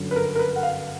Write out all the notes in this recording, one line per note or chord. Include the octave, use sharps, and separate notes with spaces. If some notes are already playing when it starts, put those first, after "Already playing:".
Already playing: G1 F#2 D3 F#3
B4
A#4
A#4
B4
F#5
F5